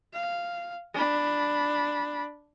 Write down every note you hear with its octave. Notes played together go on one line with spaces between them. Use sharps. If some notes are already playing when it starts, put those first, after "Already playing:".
F5
D4 B5